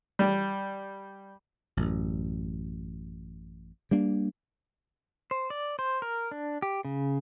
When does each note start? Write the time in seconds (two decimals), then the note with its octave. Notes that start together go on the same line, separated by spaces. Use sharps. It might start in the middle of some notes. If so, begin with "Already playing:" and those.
0.19 G3
1.77 A1 F#2
3.91 G3 A#3 D4
5.31 C5
5.50 D5
5.79 C5
6.02 A#4
6.31 D4
6.62 G4
6.85 C#3